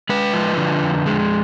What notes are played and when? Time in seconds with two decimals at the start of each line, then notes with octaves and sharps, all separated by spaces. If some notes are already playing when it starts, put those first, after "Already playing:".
0.09 G#3 B4
0.34 F3
0.57 D3
0.82 F2
1.06 G#3